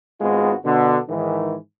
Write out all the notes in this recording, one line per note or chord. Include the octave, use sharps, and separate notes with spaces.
G#1 G#2 G#3 B3 F4 F#4
B2 D3
G#2 D#3 E3